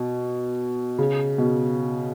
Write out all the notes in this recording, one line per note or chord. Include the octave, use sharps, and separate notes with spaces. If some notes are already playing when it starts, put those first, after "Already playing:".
Already playing: B2
C#3
B2